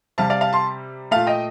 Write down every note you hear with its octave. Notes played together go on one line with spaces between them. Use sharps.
C3 G3 F5 A5
D5 F5
F5 A5
A5 C6
A#2 A3 F5 A5
D#5 G5